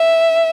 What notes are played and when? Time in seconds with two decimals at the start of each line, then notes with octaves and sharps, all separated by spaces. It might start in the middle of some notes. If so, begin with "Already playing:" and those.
Already playing: E5